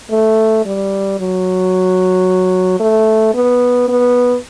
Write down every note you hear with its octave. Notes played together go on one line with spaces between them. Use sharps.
A3
G3
F#3
A3
B3
B3